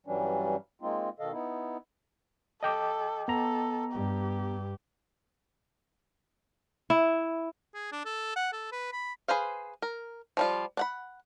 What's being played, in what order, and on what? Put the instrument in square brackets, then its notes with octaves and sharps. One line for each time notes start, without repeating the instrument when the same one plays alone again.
[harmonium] G2 E3 F#3 G3 C#4 D4
G#3 A#3 C4 D#4 F4
B2 D#3 A4 D#5 F5
B3 D#4 E4
[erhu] A4 [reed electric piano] D#5 G5 D6
[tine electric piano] B3 A#5 [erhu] A4
[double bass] G2 [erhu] G4
[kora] E4
[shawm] G#4
D4
A4
F#5
A4
B4
B5
[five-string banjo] G#4 B4 C5 F5
A#4
F3 G3 F4
D4 F#5 B5